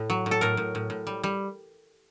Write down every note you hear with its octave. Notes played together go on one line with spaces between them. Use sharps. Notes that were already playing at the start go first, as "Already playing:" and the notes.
Already playing: A2
F#3
A2
A4
A2 A#4
A2
A2
A2
G3
G3